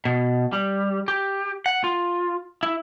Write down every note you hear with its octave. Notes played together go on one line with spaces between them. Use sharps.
B2
G3
G4
F#5
F4
E4